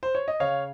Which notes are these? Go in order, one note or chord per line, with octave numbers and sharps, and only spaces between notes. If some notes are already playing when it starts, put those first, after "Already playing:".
C5
C#5
D#5
C#3 C#5 F5